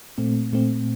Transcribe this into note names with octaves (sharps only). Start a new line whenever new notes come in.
A#2 A3 C4
A#2 A3 C4